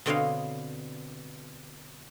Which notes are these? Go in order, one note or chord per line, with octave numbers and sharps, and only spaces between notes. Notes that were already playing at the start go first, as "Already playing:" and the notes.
B2 D3 C4 C#5 D#5 F5